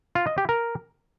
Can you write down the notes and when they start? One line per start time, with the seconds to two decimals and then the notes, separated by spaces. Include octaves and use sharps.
0.15 F4
0.27 D#5
0.38 G4
0.49 A#4